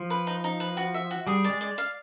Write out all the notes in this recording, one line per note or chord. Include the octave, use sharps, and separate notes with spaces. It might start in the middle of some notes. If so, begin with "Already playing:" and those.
Already playing: F3
B4
D#4
D#4
B4
F#4
E5
F#4
G3 G#4
D5
G#3
D5
F5